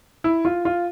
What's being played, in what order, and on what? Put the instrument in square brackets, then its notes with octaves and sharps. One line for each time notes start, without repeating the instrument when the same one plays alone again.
[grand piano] E4
F4
F4